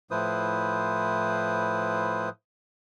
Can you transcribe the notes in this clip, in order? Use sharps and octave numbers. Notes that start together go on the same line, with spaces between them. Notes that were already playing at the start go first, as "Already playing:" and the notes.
A2 F3 E4 B4 C5 D#6